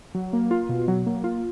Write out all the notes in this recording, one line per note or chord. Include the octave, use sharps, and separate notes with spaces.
F#3
A#3
F4
B2
F#3
A#3
F4